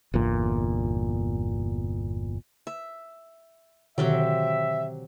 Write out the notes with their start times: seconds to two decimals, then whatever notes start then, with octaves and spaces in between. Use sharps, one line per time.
0.14 G1 E2 A#2
2.67 E5
3.98 B2 D3 D#3 F#3 C4 G4 E5